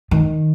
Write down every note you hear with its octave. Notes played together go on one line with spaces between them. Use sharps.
D#3